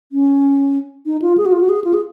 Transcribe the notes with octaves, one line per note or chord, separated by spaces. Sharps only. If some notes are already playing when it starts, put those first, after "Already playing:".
C#4
D#4
F4
G#4
F#4
F4
F#4
G#4
F4
G#4